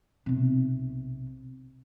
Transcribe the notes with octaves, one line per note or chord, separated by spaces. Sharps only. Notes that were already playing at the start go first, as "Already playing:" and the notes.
B1 C3